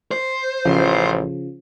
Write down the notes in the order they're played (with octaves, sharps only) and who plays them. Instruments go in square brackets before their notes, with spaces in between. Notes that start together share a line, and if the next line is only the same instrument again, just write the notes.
[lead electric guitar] C5
[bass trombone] A1 [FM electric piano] C#3 F3